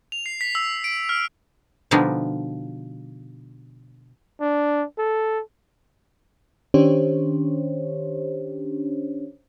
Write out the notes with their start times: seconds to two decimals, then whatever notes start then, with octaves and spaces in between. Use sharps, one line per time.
0.12 F7
0.26 C7
0.41 B6
0.55 E6
0.84 D7
1.09 F6
1.91 B2 D3 F3 G3 D4 D#4
4.41 D4
4.98 A4
6.74 D#3 C#4 D4 G4 C5 C#5